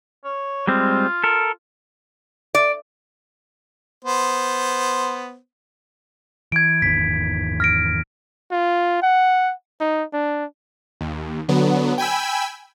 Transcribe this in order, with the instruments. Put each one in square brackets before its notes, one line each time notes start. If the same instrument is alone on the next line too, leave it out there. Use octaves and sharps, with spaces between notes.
[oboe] C#5
[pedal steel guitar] G3 G#3 C4 [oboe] F4
[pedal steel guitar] A4 A#4
[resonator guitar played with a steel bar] D5
[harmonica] B3 C5
[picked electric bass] E3 [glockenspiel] G#6 D7
[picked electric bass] G#1 E2 D#3 [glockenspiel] B6
[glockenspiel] F6 A#6 D7
[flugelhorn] F4
F#5
D#4
D4
[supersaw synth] D#2
D3 F#3 B3
G5 G#5 B5 E6